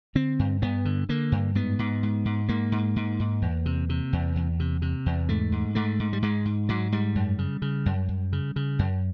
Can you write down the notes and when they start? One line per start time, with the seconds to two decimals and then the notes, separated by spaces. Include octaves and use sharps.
0.15 D3 C4
0.39 G2
0.62 G2 B3
0.85 D3
1.09 D3 A#3
1.32 G2
1.55 G#2 B3
1.79 G#2
2.03 G#2
2.25 G#2
2.49 G#2 A#3
2.72 G#2
2.96 G#2
3.20 G#2
3.42 E2
3.66 C3
3.89 C3
4.13 E2
4.36 E2
4.60 C3
4.82 C3
5.06 E2
5.29 G#2 A3
5.52 G#2
5.75 G#2 A3
5.99 G#2
6.13 G3
6.22 G#2 G#3
6.45 G#2
6.69 G#2 F#3
6.92 G#2 G3
7.15 F#2
7.39 C#3
7.62 C#3
7.86 F#2
8.09 F#2
8.33 C#3
8.56 C#3
8.79 F#2